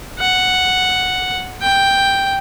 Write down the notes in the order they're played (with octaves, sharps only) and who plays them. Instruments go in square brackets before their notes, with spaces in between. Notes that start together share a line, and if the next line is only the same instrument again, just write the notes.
[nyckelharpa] F#5
G5